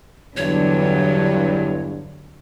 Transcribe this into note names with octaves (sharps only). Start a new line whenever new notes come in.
E2 G2 D3 F#3 C#5